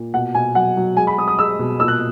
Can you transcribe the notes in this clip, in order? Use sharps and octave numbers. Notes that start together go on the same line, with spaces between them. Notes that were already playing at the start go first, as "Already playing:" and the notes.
Already playing: A#2
B2 F#5
B2 G#5
F#3 F#5
F#3
G#3 G#5
B5
G#3 D#6
D#6
G#3 E6
B2
A#2 E6
F#6